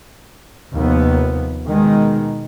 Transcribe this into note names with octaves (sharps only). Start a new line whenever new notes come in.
D#2 C3 F3 B3
B2 D#3 G#3